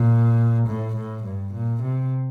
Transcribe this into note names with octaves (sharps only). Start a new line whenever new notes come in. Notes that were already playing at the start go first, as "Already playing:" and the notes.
Already playing: A#2
A2
A2
G2
A#2
C3